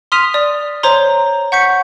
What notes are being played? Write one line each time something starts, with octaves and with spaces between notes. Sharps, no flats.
C6 D#6 F6 B6 D#7 F7
D5
C5 C#5 A#5 C6
F#5 C#6 G6 B6 C#7